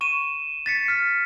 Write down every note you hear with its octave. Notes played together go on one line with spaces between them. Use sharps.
C#6 D#7 E7
A6 B6 C#7
F6 B6